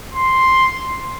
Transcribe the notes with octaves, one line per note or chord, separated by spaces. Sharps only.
C6